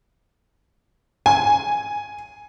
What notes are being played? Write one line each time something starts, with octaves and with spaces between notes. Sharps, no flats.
G#5